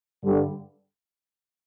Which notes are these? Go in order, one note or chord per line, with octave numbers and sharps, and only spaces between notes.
G2 D3 G3